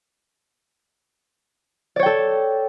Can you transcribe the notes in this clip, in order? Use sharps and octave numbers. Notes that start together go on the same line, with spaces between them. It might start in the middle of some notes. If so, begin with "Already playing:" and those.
A4 C#5 D5 G5